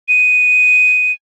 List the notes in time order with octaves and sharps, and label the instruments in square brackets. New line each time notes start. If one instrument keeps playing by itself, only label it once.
[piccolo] D#7